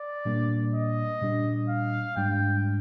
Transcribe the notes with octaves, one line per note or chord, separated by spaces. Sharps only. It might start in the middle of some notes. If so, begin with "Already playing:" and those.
Already playing: D5
A#2 G3 A#3 D4
D#5
A#2 G3 D4
F5
G#2 G3 D4 G5